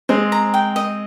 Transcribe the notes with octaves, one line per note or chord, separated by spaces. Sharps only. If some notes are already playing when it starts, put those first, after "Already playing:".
G#3 C4 C5
A#5
G5
D#5